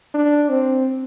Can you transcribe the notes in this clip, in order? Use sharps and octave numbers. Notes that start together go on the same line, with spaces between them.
D4
C4